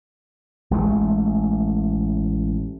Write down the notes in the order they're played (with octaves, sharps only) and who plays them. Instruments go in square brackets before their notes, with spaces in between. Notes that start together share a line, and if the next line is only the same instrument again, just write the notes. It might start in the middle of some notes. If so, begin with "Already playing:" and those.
[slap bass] A1 G#3 A3